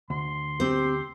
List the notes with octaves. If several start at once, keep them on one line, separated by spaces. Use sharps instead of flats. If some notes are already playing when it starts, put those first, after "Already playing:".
D2 C6
C4 G4 C5